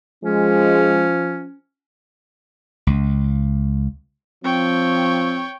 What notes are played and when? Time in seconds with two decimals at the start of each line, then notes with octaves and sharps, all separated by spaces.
0.24 F3 G#3 C#4
2.87 C#2
4.44 F3 C4 C#5 G5